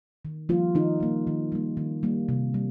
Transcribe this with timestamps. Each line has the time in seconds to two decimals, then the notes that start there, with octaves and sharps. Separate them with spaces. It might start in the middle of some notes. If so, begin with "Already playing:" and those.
0.25 D#3
0.49 F3 G3 A#3 F4
0.75 D#3 D#4
1.00 G3 A#3
1.27 D#3
1.52 G3 A#3
1.77 D#3
2.03 G3 A#3
2.29 C3
2.54 G3